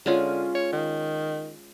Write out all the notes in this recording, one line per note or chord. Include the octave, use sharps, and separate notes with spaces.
D3 G#3 C#4 F4
C#5
D#3